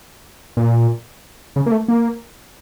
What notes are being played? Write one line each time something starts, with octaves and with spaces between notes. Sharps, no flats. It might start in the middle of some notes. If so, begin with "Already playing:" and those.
A#2
C#3
A#3
A3
A#3